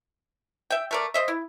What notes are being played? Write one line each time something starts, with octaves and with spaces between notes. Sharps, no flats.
E5 G5
A3 A#4 D5
C5 D#5 E5
E4